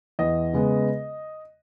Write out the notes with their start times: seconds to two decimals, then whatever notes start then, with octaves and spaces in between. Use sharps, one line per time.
0.19 E2 D#5
0.53 C#3 G#3 B3